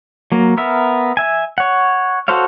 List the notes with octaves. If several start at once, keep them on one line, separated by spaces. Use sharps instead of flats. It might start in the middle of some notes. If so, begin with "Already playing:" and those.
F#3 A#3
B3 A#4 E5
E5 G#5
C#5 F#5
F#4 A4 C5 C#5 F5